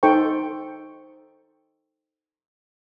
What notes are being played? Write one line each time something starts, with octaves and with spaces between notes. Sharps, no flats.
D#4 A4 C5 G5 C#6